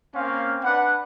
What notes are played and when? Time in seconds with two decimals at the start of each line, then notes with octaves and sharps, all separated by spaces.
0.14 A#3 C4 C#4 F5
0.63 D4 B4 F#5